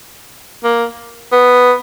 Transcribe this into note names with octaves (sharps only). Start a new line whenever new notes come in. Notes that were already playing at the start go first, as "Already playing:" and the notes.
A#3
B3